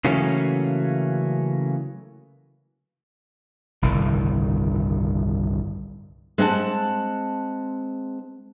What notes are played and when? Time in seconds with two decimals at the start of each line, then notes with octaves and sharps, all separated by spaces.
0.05 C#3 E3 F#3 A3 A#3 C#4
3.82 G1 C2 A2 D#3
6.38 G#3 C4 F#5 A5